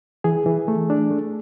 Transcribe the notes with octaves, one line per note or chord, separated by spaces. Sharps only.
E3 G#4
E3
A3
D4
A3